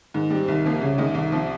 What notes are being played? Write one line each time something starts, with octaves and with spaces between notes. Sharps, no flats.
G#2 D#3
G3 C4
C2 D#3
C3 F3 A#3
C2 C#3
C3 D#3 G#3
C2 D#3
C3 F3